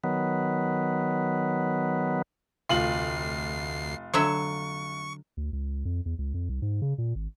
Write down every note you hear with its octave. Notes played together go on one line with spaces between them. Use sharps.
D#3 F#3 B3
F1 D2 F4 C7 F#7
D3 F#3 E5 C#6
D2
C#2
F2
E2
C#2
F2
C2
G#2
C#3
A#2
G#1